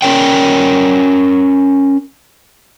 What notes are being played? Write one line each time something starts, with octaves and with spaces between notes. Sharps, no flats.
C#4 A#4 C#5 G5